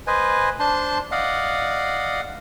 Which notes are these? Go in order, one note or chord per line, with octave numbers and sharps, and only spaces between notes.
B4 C5 D#5 G#5
D4 C5 A5 C6
D5 D#5 F5 F#5